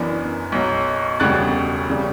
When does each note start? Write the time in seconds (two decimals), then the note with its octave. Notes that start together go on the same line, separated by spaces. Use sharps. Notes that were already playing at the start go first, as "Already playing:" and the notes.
Already playing: F#1 F#2 E3 B3 D4
0.52 B1 B2 F#3
1.20 E1 D2 C#3 G3 F#6 A6
1.87 E1 C#3 G3